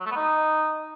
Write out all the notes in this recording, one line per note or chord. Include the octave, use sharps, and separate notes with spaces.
F#3
A3
B3
D#4